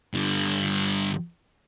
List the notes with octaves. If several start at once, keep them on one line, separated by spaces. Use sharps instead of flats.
G2 D3